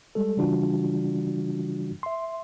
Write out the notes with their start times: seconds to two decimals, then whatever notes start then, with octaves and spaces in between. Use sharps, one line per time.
0.15 G3 G#3 A4
0.37 C#3 E3 G3 D4 F4 F#4
2.03 E5 C6